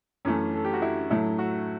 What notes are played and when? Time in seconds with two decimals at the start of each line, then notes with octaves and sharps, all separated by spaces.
0.25 F#2 E3 A3 C#4
0.55 A4
0.65 G4
0.73 F#4
0.82 E4
1.10 A2 F#3 A3 E4
1.39 F#4